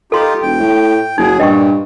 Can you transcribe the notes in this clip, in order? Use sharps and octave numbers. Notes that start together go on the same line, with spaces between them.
D#4 F4 G4 A4 C6
E1 G5
A2
F#1 F#3 D#4 G#4
G2 A#2 D#5 G5 C#6